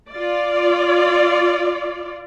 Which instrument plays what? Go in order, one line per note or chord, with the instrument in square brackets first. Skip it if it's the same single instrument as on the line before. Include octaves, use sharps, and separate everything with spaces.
[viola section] F4 D5